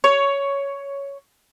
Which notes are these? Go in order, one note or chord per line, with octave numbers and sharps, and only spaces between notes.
C#5